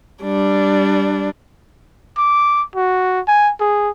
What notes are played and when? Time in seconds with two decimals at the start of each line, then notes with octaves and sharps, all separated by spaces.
0.24 G3 D4
2.17 D6
2.76 F#4
3.28 G#5
3.60 G#4